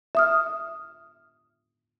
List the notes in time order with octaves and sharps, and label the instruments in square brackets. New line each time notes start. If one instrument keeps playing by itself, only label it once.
[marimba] E5 D#6 F6